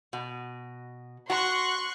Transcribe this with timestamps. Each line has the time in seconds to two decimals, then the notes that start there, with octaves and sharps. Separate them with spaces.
0.13 B2
1.30 F#4 C6 C#6 F#6